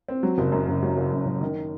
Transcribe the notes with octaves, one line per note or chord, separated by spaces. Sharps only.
C4
F#3
F#1
F#2
F#1
F#3
F#1
F#2
F#1
D#3